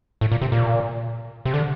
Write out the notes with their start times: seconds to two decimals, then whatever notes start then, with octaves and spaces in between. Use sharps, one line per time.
0.21 A2
0.32 A#2
0.42 C3
0.52 A#2
1.45 C3
1.54 D3